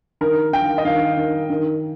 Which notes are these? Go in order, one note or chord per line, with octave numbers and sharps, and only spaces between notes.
D#3 A#4
D#3 G5
D#5
D#3 F5
D#3
D#3